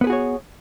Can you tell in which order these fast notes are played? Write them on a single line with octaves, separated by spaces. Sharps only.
B3 B4 G#4 F#4 C#5